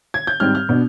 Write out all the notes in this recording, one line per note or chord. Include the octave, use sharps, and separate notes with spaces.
G#6
G6
G#2 G3 C4 F6
F6
B2 B3 D4